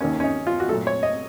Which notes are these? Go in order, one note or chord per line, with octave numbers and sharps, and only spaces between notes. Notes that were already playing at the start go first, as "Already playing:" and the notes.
D#2 D#3 A#3 C#4
C#4
D#4
F4
F#4
A#2 F#3 A3 A4
C#5
D#5